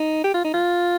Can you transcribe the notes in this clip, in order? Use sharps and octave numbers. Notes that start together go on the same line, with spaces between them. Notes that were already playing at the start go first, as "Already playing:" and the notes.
Already playing: D#4
G4
F4
D#4
F4